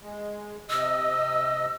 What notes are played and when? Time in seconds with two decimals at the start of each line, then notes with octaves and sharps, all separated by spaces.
0.02 G#3
0.70 C3 D#5 E6